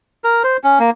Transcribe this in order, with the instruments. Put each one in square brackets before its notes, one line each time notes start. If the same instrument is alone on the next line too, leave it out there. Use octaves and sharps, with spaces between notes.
[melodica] A#4
C5
C#4
A#3